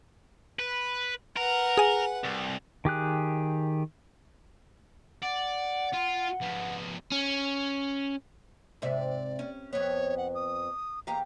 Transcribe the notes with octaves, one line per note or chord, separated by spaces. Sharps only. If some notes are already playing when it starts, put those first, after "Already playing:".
B4
A#4 B4 F#5
G#4 G#5
C2
D#3 G4 G#4 F#6
D5 F#5
F4
F3 B3
C#4
G#2 C3 D5 E5
C#4
F2 B3 C#5
F#5
D#6
E2 G4 F5 A#5